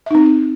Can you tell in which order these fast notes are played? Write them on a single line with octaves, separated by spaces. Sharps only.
E5 D#4 C4